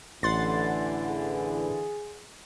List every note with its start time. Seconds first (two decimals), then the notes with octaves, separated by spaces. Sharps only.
0.23 A1 D3 E3 F#5 C6 A6
1.09 G#4